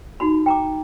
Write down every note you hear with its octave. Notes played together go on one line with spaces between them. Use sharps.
D#4 F#4 B5
G5 A#5 D6